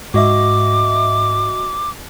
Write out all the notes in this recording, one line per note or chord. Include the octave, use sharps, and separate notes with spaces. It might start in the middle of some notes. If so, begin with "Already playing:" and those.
G#2 F#4 D#5 E5 D6